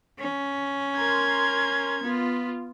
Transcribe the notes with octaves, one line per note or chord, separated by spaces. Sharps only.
C#4
A#4 C6 G#6
B3 F4